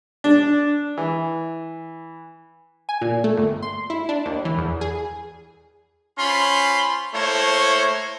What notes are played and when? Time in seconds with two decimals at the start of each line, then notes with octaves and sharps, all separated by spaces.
0.24 D4
0.97 E3
2.89 G#5
3.01 A#2
3.24 A3
3.37 G1
3.62 C6
3.90 E4
4.09 D4
4.26 D#2
4.45 E3
4.58 E2
4.81 G#4
6.19 C#4 F4 C5 B5 C6
7.14 A3 A#3 E4 C5 C#5